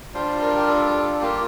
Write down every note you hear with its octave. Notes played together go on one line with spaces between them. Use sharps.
G3 D4 F4 C5
A#4
G4
A4
A4
A4
A#3 F4 G4